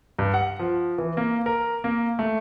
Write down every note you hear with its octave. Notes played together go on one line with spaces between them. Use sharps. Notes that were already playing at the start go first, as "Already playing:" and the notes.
G2
F#5
F3
E3
A#3
A#4
A#3
A3